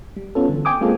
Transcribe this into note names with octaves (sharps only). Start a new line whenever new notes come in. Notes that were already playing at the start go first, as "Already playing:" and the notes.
G3
B3 C#4 F4 A4
D3 E3
G5 G#5 D6 D#6
G#3 A#3 C4 F4 G#4 A4